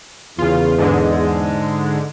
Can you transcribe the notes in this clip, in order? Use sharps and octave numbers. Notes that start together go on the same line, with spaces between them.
E2 C#3 F4
G#2 D3 G#3